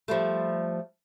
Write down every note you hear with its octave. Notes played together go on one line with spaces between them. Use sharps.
F3 G3 A3